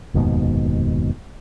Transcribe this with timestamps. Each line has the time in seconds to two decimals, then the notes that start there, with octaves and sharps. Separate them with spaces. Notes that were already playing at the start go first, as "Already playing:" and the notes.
0.14 F1 D#2 G#2 B2